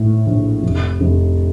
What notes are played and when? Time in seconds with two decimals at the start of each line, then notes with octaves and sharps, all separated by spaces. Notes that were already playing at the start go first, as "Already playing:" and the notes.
Already playing: A2
0.26 A#1
0.63 F1
1.01 F1